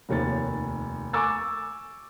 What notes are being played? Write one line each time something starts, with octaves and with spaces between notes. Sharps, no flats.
F1 D#2 C#5 A6
G#5 C#6 D6 E6 A6